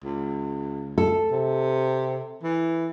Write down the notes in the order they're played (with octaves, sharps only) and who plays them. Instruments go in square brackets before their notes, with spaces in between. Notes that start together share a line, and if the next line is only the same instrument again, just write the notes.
[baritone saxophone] C#2
[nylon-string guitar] A4
[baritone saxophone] C3
E3